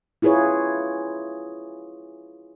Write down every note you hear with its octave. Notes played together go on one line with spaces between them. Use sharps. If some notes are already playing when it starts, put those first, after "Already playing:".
E4 F4 G#4 B4 C#5